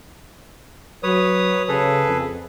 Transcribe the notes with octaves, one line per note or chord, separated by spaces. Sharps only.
F#3 B4 C#5 D#6
C#3 G#4 A4 B4
F2